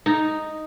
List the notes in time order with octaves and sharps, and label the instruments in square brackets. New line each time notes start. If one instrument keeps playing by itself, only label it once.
[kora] D#4